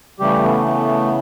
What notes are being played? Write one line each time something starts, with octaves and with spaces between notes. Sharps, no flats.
C#3 E3 G3 A3 G4
B3
B3